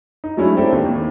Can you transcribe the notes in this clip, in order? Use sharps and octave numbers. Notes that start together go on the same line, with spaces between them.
D#4
F#3 G#3 A3 C#4 D4 E4
C4 D4 E4 G4 A4
D#2
D#2